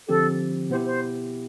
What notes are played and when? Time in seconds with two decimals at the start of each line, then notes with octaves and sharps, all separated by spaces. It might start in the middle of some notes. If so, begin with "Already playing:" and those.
0.08 D3 F3 C4 G4 A4
0.70 B2 B3 E4 G4 C5
0.86 C5